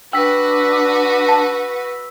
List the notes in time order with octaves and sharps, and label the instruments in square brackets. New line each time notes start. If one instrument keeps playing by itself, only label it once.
[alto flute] D4 [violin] F#4 B4 [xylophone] G5 [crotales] E6 B6
[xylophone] A5